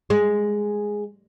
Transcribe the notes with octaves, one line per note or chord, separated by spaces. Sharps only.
G#3